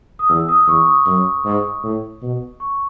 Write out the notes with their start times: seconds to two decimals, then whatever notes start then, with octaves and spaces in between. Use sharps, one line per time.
0.19 D#6
0.29 E2 E6
0.48 D#6
0.67 E2 C#6
0.87 D#6
1.06 F#2
1.45 G#2
1.83 A2
2.22 B2
2.60 C#6